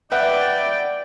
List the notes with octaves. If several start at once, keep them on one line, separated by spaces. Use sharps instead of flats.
B4 D5 E5 F#5 G5